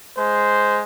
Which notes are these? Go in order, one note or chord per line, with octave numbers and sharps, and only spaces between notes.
G#3 C5